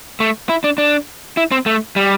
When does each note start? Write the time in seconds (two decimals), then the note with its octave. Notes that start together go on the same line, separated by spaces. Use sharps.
0.20 A3
0.49 E4
0.64 D4
0.78 D4
1.37 E4
1.51 C4
1.66 A3
1.96 G3